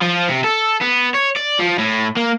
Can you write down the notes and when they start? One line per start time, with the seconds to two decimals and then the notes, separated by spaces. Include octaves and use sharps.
0.02 F3
0.29 C3
0.44 A4
0.82 B3
1.15 C#5
1.37 D5
1.59 F3
1.79 A2
2.17 A#3